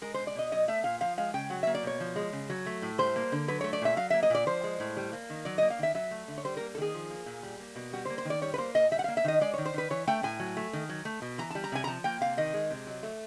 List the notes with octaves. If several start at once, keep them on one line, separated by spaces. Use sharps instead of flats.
G#3 A#4
C5
B2
D5
B2 D#5
F#3 D#5
A3 E5
A#2 F5
F3 F5
G#3 F5
C#3 G5
F#3 F#5
E5
A#3
D5
B2 C#5
F3
G#3
C#3
F#3
A3
A2
G3 C5
A#3
D3
F#3 B4
A3 C#5
D5
A#2 E5
F#3 F5
A#3 E5
D#5
A#2 D5
F3 C5
G#3
A2
G3
A#3
D#3
F#3 D5
D#5
A#3
F5
D#3 E5
F#3 E5
A3
D3
C#5
G3 C5
A#4
A#3
A4
D#3 G#4
F3
A#3
A#2
G3
A#3
B2
G3 F#4
C5
A#3
C5
D#3 D5
G3 C#5
B4
A#3 C5
A#2 D#5
G3 E5
F#5
F5
A#3
E5
D#3 D#5
G#3 D5
C#5
D#3
C5
D#3 B4
E3 C#5
A3 G5
A2 G#5
F#3
A3
D#3
F#3
A3
B2
E3 A#5
A5
G3
A#5
C3 G#5
A#5
F3 A5
A#3 G5
C3 F5
D#3 D#5
G#3
C3
F#3
A3